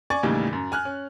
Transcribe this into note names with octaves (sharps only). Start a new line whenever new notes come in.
D5 G#5 C#6 A6
D#2 A2 C#3 E3 G3 D#4
F#2
G#5 F6 F#6
C#4